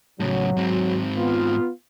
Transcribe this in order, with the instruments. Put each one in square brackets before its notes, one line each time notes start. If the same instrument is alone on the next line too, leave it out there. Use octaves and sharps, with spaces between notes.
[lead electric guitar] A2 C#3 [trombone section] F#3
[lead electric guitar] G#2 C4
[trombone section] B3 F4